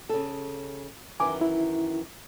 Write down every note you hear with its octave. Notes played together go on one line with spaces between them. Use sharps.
C#3 A4
F#2 D#3 E3 G#5 D6
E4